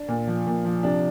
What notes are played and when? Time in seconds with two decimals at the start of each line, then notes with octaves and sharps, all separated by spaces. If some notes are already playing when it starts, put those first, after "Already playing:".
Already playing: D4
0.08 A#2
0.27 F3
0.47 A#2
0.65 F3
0.83 C3 D4